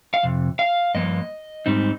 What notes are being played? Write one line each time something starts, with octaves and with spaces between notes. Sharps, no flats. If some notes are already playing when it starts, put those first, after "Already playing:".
F5
F2 C3
F5
G2 F3 A#3 D#5
G#2 G3 C4 D#4